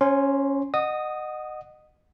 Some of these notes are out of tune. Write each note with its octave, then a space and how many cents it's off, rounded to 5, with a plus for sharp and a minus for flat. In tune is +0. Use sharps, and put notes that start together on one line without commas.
C#4 +0 C5 +40 C6 +0
D#5 -25 F#5 +0 D#6 +0